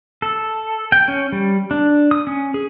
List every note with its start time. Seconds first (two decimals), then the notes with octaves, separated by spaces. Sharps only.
0.22 A4
0.92 G5
1.08 C#4
1.32 G3
1.71 D4
2.11 D#6
2.27 C#4
2.54 G#4